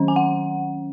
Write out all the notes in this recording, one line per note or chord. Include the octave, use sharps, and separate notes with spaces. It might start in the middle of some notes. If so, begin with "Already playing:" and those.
Already playing: D#3 F#3 C#4
G#5
F#5